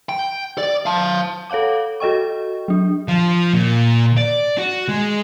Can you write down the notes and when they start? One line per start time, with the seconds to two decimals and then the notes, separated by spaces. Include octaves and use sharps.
0.09 G5
0.58 D5
0.86 F5 A5
1.50 A4 C#5 F5 F#5 D6
2.00 F#4 A4 D#5 G5 C#6
2.68 F#3 D4
3.08 F3
3.53 A#2
4.17 D5
4.58 F#4
4.88 G#3